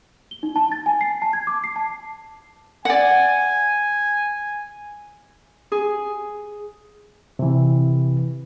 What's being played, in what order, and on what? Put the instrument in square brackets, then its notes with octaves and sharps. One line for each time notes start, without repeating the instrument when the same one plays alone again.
[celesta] G7
D#4
A5
A6
G#5
C7
A5
G#6
D6
C7
A5
[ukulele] D5 F#5 [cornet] G#5
[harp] G#4
[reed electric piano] C3 E3